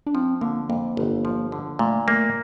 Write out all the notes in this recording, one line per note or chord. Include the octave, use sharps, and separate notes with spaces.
D4
F3 C4
D3 A#3
F2 A#3
G1
F3
D3
A#2 A3
A3 A#3